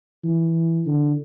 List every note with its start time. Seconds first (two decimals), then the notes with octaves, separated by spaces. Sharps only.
0.24 E3
0.86 D3